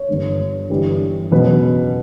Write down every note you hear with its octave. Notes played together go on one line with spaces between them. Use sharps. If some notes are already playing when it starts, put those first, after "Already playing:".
Already playing: C#5
G1 G2 D3
G1 G2 E3 G3
F#1 E2 B2 F#3 B4